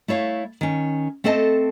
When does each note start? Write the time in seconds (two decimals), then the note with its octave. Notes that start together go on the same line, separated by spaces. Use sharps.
0.08 A3 E4 C#5 F5
0.61 D#3 C#4
1.24 A3 C4 A4 D#5 A5